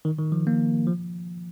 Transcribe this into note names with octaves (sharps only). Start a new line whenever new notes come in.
D#3
D#3
F3
A#3
F3